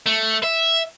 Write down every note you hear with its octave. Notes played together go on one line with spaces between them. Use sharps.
A3
E5